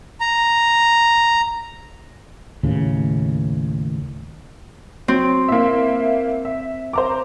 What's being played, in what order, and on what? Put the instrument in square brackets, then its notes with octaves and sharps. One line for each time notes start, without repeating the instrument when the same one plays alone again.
[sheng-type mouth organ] A#5
[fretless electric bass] D#2 A2 C#3
[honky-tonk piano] F#3 [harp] C4
[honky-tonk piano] A#3 E4 E5
E5
C5 A#5 D6